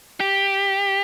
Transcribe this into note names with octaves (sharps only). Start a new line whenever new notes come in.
G4